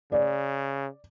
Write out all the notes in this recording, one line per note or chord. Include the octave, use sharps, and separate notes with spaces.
C#3 D5